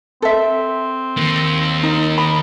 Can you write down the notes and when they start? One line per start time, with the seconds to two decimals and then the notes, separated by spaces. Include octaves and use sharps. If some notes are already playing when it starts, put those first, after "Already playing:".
0.22 C4 A4 E5
1.17 D#2 A#3
1.83 D#4 A#4
2.18 D#4 B5